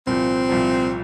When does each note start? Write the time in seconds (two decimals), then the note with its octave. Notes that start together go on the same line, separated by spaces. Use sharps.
0.07 C2 A#2 F3 C4
0.49 C2 A#2 F3